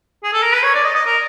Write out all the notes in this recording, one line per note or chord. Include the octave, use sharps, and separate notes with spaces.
G#4
A4
A#4
B4
C#5
D5
D#5
D#5
A#4